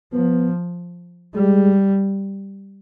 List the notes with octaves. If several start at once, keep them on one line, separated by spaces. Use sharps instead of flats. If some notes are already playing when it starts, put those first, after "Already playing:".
F3 B3
G3 G#3